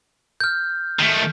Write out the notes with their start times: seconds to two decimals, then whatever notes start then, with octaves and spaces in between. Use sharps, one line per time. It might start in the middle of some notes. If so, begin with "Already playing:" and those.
0.40 F6 G6
1.00 D#3 A3